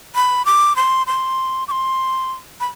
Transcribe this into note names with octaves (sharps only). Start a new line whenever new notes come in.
B5
D6
C6
C6
D6
C6
B5